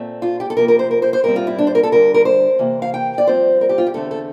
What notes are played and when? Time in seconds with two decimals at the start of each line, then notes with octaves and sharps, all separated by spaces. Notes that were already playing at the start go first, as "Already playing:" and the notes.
Already playing: A#2 A3 C4
0.22 F4
0.40 G4
0.50 A4
0.56 C3 F3 A#3 A#4
0.68 A#4
0.79 C5
0.91 A#4
1.02 C5
1.13 C5
1.24 A2 G3 C4 A#4
1.36 F4
1.47 E4
1.58 D4
1.67 C5
1.75 A#4
1.83 A4
1.92 D2 D3 G3 A#4
2.14 A#4
2.25 C5
2.59 C3 E3 A#3
2.82 F5
2.94 G5
3.18 D5
3.27 G2 F3 C4 C5
3.61 A#4
3.69 G4
3.78 F4
3.87 G4
3.94 E2 D3 A3 C4 A4
4.11 A4